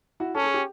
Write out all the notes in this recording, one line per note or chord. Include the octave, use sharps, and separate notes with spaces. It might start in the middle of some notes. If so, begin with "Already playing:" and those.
E4 F#4
C#4 A4
G#4
G4